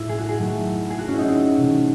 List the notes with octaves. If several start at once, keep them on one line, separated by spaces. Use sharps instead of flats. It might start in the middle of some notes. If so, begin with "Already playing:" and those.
Already playing: A2 G#3 E4
G#4
F#4
G#4
D#3 F#3 A3
G#4
F#4
C#4
D#4 E4
C4
C3 E3 A3